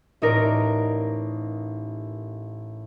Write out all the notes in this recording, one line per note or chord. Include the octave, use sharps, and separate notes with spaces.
A1 D#4 A#4 D5